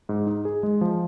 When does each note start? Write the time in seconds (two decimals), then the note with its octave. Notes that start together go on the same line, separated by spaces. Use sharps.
0.09 G#2
0.27 D#4
0.45 G#4
0.63 G#3
0.81 F3